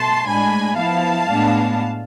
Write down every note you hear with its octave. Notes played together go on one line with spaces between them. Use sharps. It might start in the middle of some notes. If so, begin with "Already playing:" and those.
Already playing: B2 A3 A5 C6
A2 G#3 D4 G#5 B5
F3 B3 E4 F5 A5
A2 G#3 B3 D4